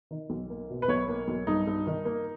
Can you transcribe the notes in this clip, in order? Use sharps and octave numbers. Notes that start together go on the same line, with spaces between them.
D#3
B1
A#3
B2
B4
B1 C#5
A#3
B1
G2 D#4
G2
D#3
A#3